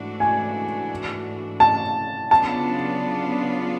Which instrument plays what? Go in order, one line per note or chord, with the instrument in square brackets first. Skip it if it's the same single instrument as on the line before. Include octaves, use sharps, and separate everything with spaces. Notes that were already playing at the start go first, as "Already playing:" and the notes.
Already playing: [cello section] G#2 E3 A3 D4 F#4
[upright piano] G#5
A5
[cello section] C#3 F#3 B3 D4 F4 [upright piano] A5